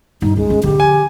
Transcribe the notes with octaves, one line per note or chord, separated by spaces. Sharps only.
G2 D#4
C#2 G#3
F3 C#4
D3 F3 G4
G#5